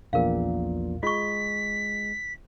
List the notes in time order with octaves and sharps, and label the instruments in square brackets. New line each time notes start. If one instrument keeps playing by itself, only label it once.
[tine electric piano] A#1 E2 A#2 [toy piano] A#4 F5
[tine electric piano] G#3 [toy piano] F4 C#6 [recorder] B6